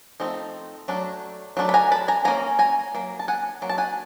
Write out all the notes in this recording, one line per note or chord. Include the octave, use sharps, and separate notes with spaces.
F3 A3 C4 D#4
F#3 A3 D4
F#3 A3 D4
B5
G#5 A#5
A5 B5
G#5 A#5
F#3 A#3 C#4 G#5 A#5
G#5 A#5
F#3 A#3
A5
F#5 G#5
F#3 A#3
A5
F#5 G#5